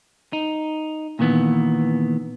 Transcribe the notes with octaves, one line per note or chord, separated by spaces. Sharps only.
D#4
A#2 D#3 E3 B3